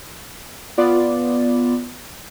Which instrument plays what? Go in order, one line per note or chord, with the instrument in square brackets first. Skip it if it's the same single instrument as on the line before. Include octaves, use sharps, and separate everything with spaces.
[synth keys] B3 F4 D5